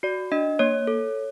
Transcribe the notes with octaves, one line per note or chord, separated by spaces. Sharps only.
F#4 D5
D4 D#5
A#3 C#5
A4